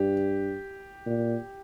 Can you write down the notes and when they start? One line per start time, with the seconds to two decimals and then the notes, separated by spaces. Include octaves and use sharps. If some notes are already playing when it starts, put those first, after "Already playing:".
Already playing: G2 G4
1.06 A#2